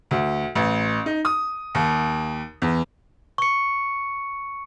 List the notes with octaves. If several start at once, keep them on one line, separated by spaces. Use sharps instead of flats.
D2
A1
D#4
D#6
D#2
E2
C#6 C#7